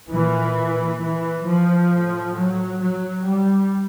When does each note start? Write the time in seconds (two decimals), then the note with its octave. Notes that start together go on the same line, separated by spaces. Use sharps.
0.10 A#2 E3
1.00 E3
1.46 F3
1.92 A2
2.37 F#3
2.81 F#3
3.26 G3